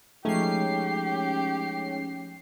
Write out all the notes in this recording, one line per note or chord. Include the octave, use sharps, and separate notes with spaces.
F3 G#3 A3 C#4 D#4 G4 G#4 C7